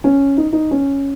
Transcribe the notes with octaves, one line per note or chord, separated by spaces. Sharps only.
C#4
D#4
D#4
C#4